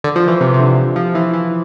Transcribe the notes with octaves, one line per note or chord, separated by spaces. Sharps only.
D3
F3
E3
C3
C3
D3
F3
E3
E3